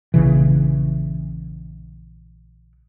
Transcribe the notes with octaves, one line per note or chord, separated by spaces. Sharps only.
A#1 C#3 E3